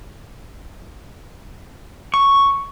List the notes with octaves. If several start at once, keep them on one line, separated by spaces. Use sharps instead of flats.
C#6